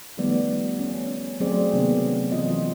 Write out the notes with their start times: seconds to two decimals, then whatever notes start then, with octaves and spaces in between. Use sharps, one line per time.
0.17 D#3 F3 G3 A3 B3 D5
0.79 C#4
1.40 F#3 A3 C4 G#4 C5 D5
1.73 C3 D#3 A#3 B3 C#4
2.32 E3 F#3 C4 F4 D#5